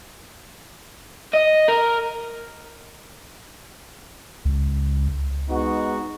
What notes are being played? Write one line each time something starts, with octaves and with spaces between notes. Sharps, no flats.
D#5
A#4
C#2
G#3 B3 D#4 F#4